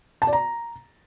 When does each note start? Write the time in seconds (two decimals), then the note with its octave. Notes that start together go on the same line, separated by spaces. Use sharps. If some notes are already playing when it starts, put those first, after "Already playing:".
0.22 A5
0.27 D5
0.33 A#5